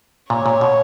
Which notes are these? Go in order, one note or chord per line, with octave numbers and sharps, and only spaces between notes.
A#2 C#5
A#2
B2